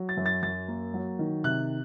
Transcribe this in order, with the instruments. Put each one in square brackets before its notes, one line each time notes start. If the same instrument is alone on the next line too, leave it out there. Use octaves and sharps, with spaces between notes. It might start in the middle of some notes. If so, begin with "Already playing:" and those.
Already playing: [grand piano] F#3
A6
F#2
A6
F#2 A6
A#3
F#3
D#3
C3 F#6